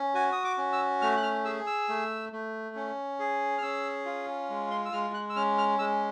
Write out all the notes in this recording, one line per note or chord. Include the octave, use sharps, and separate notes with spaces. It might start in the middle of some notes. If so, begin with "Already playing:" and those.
Already playing: C#4
F#4 G#5
D#6
D6
C#4
E6
A3 F6
F#6
F6
G#4 E6
E6
A3
A3
C#4
G#4
F6
C#4 E6
F4
G#3
C6
E6
G#3 F6
F#6
E6
C#4 F6
F6
G#3 E6